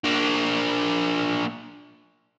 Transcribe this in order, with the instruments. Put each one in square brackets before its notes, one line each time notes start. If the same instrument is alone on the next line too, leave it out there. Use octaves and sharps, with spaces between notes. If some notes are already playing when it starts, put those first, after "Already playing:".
[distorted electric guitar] A#3 D4